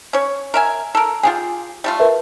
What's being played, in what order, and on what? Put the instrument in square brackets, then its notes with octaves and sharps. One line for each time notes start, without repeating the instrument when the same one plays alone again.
[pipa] C#4 C#5
A#4 E5 G#5
A4 A#4
[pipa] F4 G4 G#4 [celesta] G#5
[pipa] G3 A3 F4
[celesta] A#4 B4 E5